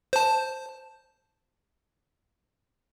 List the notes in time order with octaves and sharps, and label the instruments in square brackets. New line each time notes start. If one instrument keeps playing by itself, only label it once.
[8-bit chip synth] C5 A5